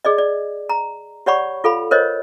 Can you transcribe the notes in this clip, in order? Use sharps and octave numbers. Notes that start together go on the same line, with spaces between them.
G#4 D5 D#5
D5
A#5
G4 C#5 D5 F#5 B5 C#6
F4 A4 F5 B5
A#4 C5 C#5 D#5